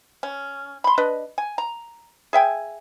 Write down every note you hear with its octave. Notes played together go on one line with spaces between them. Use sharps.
C#4
B5 C6
D4 B4 D#5
G#5
A#5
G#4 E5 G5 G#5